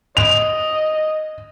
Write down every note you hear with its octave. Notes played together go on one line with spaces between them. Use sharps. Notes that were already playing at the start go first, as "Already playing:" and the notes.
D#5 F7